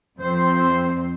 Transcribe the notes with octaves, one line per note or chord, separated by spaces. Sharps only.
F2 C4 C5